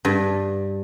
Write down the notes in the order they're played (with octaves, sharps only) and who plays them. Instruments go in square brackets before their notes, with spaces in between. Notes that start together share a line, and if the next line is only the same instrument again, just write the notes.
[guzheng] G2